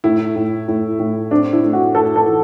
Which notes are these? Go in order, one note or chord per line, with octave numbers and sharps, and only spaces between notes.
A2 E4
A2
A2
A2
C4 D4
E4
A3
F#4
A2 A4
A4
E3